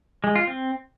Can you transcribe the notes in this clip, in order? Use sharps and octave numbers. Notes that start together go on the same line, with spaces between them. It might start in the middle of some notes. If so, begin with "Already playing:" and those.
G#3
F4
C4